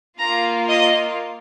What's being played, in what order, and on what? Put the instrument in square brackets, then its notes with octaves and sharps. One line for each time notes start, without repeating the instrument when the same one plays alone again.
[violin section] A#3 F4 A#5
D#5